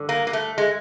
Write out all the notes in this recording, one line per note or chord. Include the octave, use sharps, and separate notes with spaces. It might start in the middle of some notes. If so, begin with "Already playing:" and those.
Already playing: G2 D3
A#3
A#3
A3
G#3